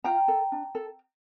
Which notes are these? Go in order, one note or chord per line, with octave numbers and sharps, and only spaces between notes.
F4 G5 A#5
A4
D4
A4